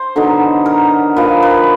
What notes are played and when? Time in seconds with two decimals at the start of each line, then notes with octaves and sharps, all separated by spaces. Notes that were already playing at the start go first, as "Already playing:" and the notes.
Already playing: C5
0.16 D3 F#3 B3 D#4
0.66 A#4
1.16 A#2 F3 A#3 B4
1.42 B4